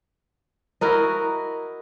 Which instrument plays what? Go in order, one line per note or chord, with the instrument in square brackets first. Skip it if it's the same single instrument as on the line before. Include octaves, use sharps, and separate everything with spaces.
[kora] E4 F#4 A#4 D#5